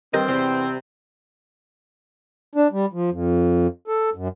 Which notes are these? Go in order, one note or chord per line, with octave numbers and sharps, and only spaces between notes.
G2 D#3 C4 G4 A#4 D#5
E2 C3 G3 C5 C6
D4
G3
F3
F2
A4
F#2